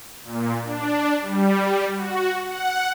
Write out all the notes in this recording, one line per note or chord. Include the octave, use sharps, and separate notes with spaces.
A#2
D4
G3
F#4
F#5